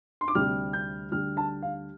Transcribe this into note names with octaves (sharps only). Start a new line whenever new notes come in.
C6
D6
D2 C3 G3 F6
G6
D2 D3 G3 F6
A5
F5